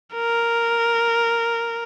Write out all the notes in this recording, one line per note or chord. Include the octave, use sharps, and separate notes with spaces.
A#4